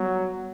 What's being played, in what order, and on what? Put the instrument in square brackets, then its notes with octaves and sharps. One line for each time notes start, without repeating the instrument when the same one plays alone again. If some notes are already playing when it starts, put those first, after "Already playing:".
Already playing: [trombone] F#3 [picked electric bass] G3 B3